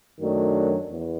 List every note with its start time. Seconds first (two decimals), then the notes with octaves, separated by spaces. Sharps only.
0.19 F#2 D#3 F#3 A3 D4
0.90 E2